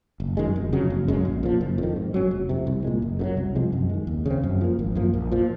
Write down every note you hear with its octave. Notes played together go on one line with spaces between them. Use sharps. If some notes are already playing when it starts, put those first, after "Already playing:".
F#1
F#2 D#3 G#3
F1
F2 C#3 F#3
F#1
F#2 C#3 G#3
A#1
A#2 F3
F#1
F2 D#3
G#2
F#3 C#4
F1
F2 C3
C2
A#2 G#3
F#1
F#2 C#3 F#3
C2
C3 F3 G#3
F#2
D#3 G#3
D#2
C#3 G#3 C4
F#2
F3 A#3
G#1
F#2 F3 A#3
A#1
A#2 F3